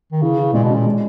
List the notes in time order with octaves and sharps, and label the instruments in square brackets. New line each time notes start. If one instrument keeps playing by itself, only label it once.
[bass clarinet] D#3
[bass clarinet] C#3 [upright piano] E3
[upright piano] E3
[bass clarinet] A#2 [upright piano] G#3
[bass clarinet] B2
[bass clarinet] A#2 [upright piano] C#4
[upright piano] G#3